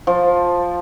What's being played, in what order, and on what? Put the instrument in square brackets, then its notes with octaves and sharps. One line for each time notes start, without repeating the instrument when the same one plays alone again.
[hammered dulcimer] F3